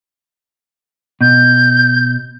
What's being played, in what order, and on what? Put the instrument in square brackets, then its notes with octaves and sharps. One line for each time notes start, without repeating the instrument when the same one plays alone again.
[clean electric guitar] B2 [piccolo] G6